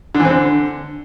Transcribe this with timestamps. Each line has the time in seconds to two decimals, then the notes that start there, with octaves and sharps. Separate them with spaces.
0.15 D3
0.20 E3
0.25 C4
0.30 D3